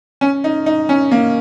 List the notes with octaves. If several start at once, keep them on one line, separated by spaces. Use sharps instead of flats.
C#4
D#4
D#4
C#4
A#3